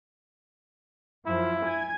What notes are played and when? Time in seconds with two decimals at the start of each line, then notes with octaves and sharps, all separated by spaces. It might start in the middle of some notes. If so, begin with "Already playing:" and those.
1.26 F#2 F3 E4
1.64 G#5 G#6